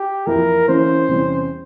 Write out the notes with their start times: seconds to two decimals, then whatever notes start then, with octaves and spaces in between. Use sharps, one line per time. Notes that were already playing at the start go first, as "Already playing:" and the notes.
Already playing: G4
0.27 F2 E3 A#3 E4 A#4
0.68 E3 A#3 C#4 C5
1.09 E2 C3 G3 C#4